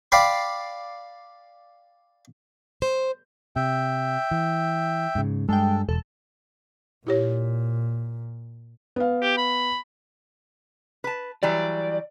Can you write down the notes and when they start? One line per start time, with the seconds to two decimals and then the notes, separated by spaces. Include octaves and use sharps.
0.12 D5 F5 G5 B5 C6
2.82 C5
3.56 C3 E5 G5
4.31 E3
5.15 G#2 C#3
5.49 G2 G#3 A4 G5
5.89 E1 A4
7.07 A#2 E4 G4 C#5
8.96 B3 F5
9.22 G4
9.37 B5
11.04 B4 A5
11.43 E3 F#3 G3 D5